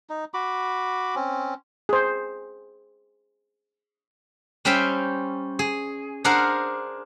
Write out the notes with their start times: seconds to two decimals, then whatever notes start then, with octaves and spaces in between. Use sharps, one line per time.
0.10 D#4
0.34 F#4 B5 D6
1.16 C4 C#4
1.89 G#4 C5
4.65 G3 C#4 C5 E5 F5 G5
5.59 G#4
6.24 D4 G#4 A#4 C5 F5 F#5